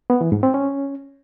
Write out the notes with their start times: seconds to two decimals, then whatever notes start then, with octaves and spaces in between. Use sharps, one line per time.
0.10 B3
0.21 E3
0.32 G#2
0.43 C4
0.54 C#4